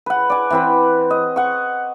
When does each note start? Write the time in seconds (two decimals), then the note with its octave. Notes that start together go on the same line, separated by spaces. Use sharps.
0.06 B4 F#5
0.30 D5 G#5
0.50 E3 C4 B4
1.10 D#5
1.36 F#5 C#6